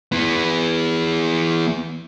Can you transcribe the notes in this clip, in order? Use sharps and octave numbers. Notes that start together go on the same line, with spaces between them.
E3 B3